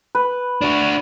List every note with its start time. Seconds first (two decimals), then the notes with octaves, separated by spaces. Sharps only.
0.15 B4
0.62 D4 F#4